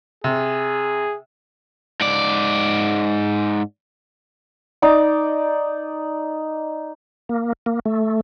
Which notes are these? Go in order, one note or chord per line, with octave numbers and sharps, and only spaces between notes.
C3 G#4
G#2 D5
D#4 D5 D6
A#3
A#3
A3